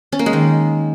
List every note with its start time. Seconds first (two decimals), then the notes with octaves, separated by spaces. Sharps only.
0.12 C#4
0.19 A#3
0.26 G#3
0.33 D#3